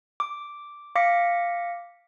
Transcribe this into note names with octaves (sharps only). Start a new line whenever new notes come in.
D6
F5 D6 A#6 B6 C#7